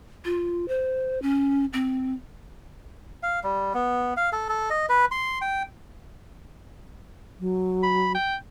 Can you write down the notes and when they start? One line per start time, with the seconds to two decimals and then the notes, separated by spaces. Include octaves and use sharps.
0.25 F4
0.68 C5
1.22 C#4
1.73 C4
3.23 F5
3.44 G3
3.74 B3
4.17 F5
4.32 A4
4.49 A4
4.70 D#5
4.89 B4
5.11 C6
5.41 G5
7.40 F#3
7.83 B5
8.15 G5